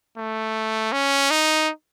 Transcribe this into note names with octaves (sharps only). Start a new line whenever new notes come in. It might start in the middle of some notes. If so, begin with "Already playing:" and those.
A3
C#4
D#4